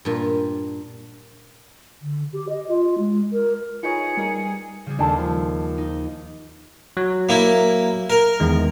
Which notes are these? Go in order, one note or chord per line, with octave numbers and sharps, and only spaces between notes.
G2 A#2
D3
G4
D#5
F4
G#3
A#4
D#4 F4 G#4 B4 C#5 C#7
G3 D#4 A#4 G#5
C#3 G3 G#4
D#2 D4 G#4 A4
F3
D#4
F#3
A#3 E4
A#4
E2 D#3 G#3